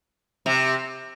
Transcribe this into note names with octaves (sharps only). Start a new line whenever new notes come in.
C3